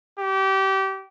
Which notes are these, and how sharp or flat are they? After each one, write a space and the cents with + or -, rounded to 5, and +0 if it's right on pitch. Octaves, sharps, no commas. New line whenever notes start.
G4 -25